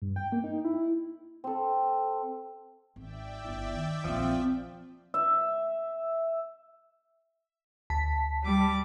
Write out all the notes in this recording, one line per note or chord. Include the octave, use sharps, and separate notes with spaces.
G2
G5
A#3
D#4
E4
C4 A4
G#1 D5 E5 G5
G1 E4
D#3
A#1 E2 F3 C4
E5
D2 A5 B6
G3 D6